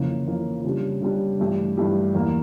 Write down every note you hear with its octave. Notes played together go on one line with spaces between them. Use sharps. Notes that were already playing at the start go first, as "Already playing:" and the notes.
Already playing: F2 C#3 E3 A#3
F2 C#3 E3 A#3
C#3 G3 D4 G4
C#3 G3 D4 G4
G2 E3 A3 E4 G4
G2 E3 A3 E4 G4
E2 E3 A#3